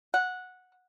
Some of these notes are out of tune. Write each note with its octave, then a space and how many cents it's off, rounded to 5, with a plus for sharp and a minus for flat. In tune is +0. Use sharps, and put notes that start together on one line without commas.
F#5 -10